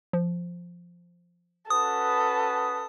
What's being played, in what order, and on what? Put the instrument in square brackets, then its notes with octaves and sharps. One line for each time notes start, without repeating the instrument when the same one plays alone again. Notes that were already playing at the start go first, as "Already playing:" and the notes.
[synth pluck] F3
[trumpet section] C#4 F#4 B4 [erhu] A4 [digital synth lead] D#6